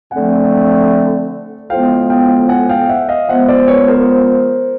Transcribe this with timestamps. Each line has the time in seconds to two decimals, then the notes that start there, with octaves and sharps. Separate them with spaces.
0.11 D3 F3 A3 C4 F#5 G#5
1.70 A2 F3 G#3 B3 F5 G5
2.10 F5 G5
2.49 F#5 G#5
2.69 F5 G5
2.89 E5 F#5
3.09 D#5 F5
3.28 F3 G#3 B3 E5 F#5
3.48 C5 D5
3.68 B4 C#5
3.88 A#4 C5